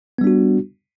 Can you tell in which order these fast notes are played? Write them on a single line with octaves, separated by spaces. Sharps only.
B3 G3 D4 F#4